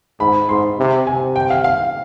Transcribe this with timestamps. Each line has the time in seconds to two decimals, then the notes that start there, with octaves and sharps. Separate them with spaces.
0.20 G#2 B5
0.49 G#2 C6
0.78 C3
1.07 C3 G#5
1.36 G5
1.50 F5
1.64 F5